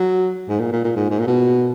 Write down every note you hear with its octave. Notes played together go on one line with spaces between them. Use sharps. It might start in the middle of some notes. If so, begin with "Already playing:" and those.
Already playing: F#3
G#2
A#2
A#2
A#2
G#2
G#2
A#2
B2